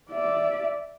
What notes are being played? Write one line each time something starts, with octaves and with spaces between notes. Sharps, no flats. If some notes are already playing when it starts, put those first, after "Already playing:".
D5 E5